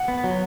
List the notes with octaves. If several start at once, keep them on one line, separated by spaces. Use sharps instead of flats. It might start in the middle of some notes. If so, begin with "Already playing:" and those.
Already playing: F#5
B3
F#3